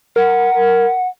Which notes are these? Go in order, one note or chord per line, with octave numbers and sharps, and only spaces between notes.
A#4 F#5